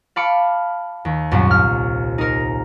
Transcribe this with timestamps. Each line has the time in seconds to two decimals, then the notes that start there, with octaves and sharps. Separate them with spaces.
0.16 F5 A5 B5 D6 C#7
1.05 D#2
1.31 C2 F#2 A#2
1.51 F6
2.18 D#4 A#4